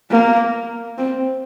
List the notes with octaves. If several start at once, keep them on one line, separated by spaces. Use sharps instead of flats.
A#3
C4